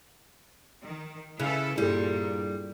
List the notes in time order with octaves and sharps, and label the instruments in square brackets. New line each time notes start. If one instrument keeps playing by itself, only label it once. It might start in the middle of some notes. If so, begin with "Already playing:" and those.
[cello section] D#3
[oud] C#3 [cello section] E4 A4 B4 [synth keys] F#6
[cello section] G2 A#2 [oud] G3 [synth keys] E4 G#4 A4